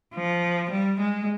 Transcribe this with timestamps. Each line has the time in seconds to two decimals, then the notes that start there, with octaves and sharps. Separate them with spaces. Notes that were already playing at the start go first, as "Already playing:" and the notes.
0.14 F3
0.71 G3
1.00 G#3